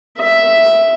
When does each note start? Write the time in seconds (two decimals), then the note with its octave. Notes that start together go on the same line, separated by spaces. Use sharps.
0.18 E5